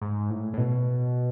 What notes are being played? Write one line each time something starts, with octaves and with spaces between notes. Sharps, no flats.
G#2
A2
A2
B2